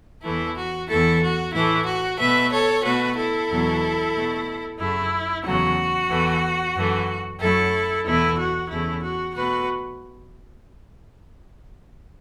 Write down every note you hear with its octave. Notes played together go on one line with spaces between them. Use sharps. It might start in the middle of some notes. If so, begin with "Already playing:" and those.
E2 E3 A3 E4
F#4
E2 E3 A3 E4 A4
F#4
A2 E3 A3 E4
F#4
B2 A3 B4 E5
A4 C#5
B2 A3 F#4 B4
E4 A4
E2 B2 F#3
B2 A3
F#2 C#3 A3 E4
E2 C#3 F#3 A3 F#4
E2 E3 A3
F#2 E3 A3
F#2 F#3 A3 E4 A4
E2 B2 A3 E4
F#4
E2 C#3 A3 E4
F#4
B2 A3 F#4 B4